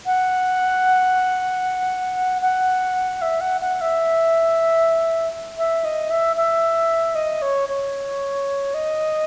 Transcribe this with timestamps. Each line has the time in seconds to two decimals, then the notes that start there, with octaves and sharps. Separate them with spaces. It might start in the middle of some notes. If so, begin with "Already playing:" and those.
0.06 F#5
2.42 F#5
3.22 E5
3.41 F#5
3.61 F#5
3.81 E5
5.58 E5
5.84 D#5
6.10 E5
6.36 E5
7.15 D#5
7.42 C#5
7.69 C#5
8.74 D#5